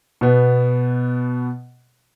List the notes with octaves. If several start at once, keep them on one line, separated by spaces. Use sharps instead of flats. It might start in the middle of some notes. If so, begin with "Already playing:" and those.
B2 B3